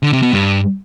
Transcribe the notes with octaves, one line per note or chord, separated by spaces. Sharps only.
D3
C3
B2
G2